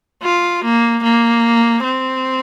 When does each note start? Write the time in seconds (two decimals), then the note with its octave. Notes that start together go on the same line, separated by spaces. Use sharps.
0.23 F4
0.64 A#3
1.03 A#3
1.84 C4